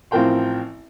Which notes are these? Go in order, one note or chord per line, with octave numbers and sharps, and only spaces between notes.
A1 F3 C4 A#4 G5 C6